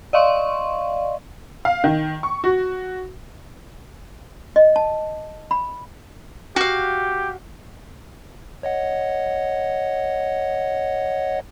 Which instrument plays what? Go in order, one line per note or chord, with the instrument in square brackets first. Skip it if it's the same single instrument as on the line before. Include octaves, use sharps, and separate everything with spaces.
[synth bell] D5 D#5 F5 C6 C#6
[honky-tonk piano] F5
D#3
C#6
F#4
[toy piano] D#5
A5
B5
[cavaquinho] F#4 F5 [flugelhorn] G4
[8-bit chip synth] C#5 D#5 F#5